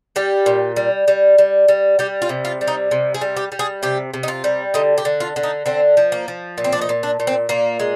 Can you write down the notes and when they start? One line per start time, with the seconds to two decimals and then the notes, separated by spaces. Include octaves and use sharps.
0.16 G3 G4
0.46 A#2
0.76 G3
1.08 G3
1.38 G3
1.68 G3
1.99 G3 G4
2.22 F4
2.29 C3
2.45 F4
2.61 G3
2.68 D#4
2.91 C3
3.14 G#4
3.21 G3
3.37 G4
3.52 G3
3.59 G#4
3.83 C3 G4
4.14 C3
4.23 D#4
4.28 F4
4.44 G3
4.74 D3 D#4
4.98 G4
5.05 D3
5.20 F4
5.36 D3
5.43 D#4
5.66 D3 C4
5.97 F3
6.12 A#3
6.28 F3
6.58 A#2
6.64 C4
6.73 D4
6.81 D#4
6.89 A#2
7.03 D4
7.20 A#2
7.27 C4
7.49 A#2 A#3
7.80 G#3